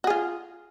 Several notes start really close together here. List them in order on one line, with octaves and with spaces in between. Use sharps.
F#4 G#4 F4